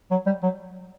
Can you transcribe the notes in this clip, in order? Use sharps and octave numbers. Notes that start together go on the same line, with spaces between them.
F#3
G3
F#3